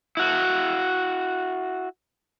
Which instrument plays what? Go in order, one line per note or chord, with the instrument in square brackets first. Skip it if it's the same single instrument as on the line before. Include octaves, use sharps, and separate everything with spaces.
[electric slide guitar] E4 F#4